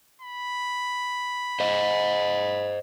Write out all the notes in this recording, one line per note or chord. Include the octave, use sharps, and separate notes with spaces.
B5
C5 D#5